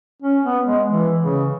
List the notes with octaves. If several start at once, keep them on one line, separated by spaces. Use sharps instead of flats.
C#4
B3
G#3
E3
C#3